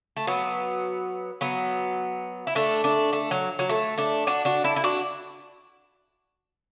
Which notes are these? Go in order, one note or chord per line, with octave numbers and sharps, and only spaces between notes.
A3
F#3 B3
F#3 B3
E4
A3 D4
A3 D4
A3
F#3
F#3
A3
A3 D4
D4 F#4
D4 F#4
E4 A4
E4
D4 F#4